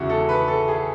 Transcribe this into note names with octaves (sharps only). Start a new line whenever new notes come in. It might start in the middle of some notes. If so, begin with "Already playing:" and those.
Already playing: E2 C#3 G#3 E4 F#4
A4
B4
A4
G#4